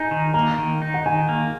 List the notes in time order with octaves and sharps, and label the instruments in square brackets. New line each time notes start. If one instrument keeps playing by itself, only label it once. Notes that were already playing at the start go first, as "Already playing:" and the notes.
Already playing: [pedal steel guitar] D#4 [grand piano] G#5
[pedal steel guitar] D#3
[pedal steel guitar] A#3 [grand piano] A#5
[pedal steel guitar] D#3
D#4
[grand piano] F#5
[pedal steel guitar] D#3 [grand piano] G#5
[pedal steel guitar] A#3